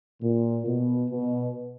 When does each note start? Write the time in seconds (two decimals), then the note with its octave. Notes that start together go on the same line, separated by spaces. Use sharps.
0.22 A#2
0.66 B2
1.10 B2